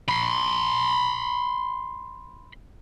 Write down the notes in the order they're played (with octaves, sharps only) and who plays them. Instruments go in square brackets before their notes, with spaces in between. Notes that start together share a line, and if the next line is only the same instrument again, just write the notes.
[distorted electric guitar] B5 C6